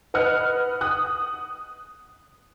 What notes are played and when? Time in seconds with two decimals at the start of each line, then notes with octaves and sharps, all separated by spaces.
0.14 B4 D#5 F#5 F6 F#6
0.81 D#6 F#6